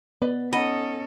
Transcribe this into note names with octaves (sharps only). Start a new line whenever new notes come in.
B3 B4 D5 D#5
C#4 D#4 A4 D#5 F#5 B5